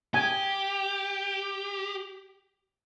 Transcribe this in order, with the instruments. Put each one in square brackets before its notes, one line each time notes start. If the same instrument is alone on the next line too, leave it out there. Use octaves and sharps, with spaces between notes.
[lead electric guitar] G4 [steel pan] G#5